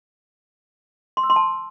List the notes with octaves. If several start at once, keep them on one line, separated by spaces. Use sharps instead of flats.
C6
E6
C6
A5